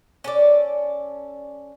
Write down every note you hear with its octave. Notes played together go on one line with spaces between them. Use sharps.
C#4 A4 D5